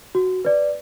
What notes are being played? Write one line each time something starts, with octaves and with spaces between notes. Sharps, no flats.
F#4
B4 D5